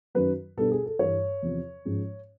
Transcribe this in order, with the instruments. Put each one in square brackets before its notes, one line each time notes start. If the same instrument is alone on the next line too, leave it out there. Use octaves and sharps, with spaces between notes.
[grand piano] F#2 D#3 F#3 B4
B2 G3 B3 D4 A4
G#4
A4
G2 E3 G3 C#5
E2 C3 F3
G#2 F3 G#3 C#4